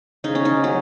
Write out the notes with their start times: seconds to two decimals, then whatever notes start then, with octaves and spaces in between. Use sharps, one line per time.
0.24 C#3 D#4
0.35 C#4
0.45 D#4
0.63 F#3 C#4